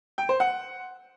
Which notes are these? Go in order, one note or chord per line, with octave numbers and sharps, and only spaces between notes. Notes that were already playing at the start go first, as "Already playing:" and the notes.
G5
C5
F#5